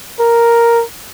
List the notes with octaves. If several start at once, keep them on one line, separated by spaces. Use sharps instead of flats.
A#4